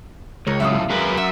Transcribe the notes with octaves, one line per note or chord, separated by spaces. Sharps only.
C#2 A#4 C#5
F#2 A2 E5 F5 D#6
F#3 G#3 A#4 B4
E5 F#5